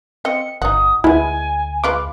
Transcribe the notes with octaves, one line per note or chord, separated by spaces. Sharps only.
C4 D#5 C#7
G1 D#4 F#4 D#6
D2 G#3 B3 E4 G#5
G#3 F4 B4 D6